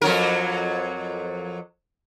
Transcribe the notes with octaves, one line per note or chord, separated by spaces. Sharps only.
F2 F#3 A#4